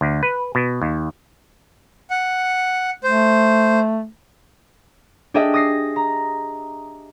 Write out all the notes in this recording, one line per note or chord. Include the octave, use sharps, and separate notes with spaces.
D2
B4
B2
D#2
F#5
A3 C5
D4 G4 G#4 D#5 E5
D#6 A#6 C7
A#5